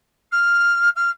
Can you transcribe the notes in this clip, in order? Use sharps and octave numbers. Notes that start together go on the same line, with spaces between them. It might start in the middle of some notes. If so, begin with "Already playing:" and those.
F6
F6